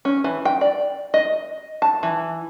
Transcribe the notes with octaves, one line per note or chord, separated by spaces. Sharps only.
C#4
E3
G5
D5
D#5
A5
E3